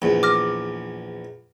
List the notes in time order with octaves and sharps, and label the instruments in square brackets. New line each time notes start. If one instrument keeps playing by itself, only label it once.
[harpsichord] A#1 E2
[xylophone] D6 F6 A#6